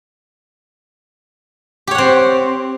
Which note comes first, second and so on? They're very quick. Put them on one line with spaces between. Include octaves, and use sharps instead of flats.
G4 C#5 F#5 C4